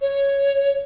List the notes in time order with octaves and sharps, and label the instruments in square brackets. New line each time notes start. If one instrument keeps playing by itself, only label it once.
[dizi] C#5